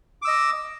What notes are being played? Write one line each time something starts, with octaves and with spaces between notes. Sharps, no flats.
D#5 D6 E6